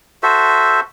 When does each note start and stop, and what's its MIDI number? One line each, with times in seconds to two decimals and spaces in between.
0.23 0.80 66
0.23 0.80 69
0.23 0.80 72
0.23 0.80 76